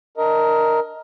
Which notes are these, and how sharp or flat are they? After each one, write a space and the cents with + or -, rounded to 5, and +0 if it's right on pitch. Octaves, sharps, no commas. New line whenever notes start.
D4 +0 A#4 +0 D#5 +20